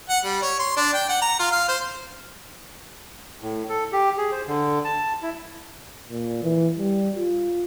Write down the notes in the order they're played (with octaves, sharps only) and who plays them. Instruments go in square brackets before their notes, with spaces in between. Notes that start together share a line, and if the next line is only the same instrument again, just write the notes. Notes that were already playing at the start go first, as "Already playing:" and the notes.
[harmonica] F#5
G3
C#5
C6
D4
G5
F#5
A#5
F4
F5
C5
[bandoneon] A2
A4
G4
G#4
C5
D3
A5
E4
[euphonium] A#2
E3
G3
F4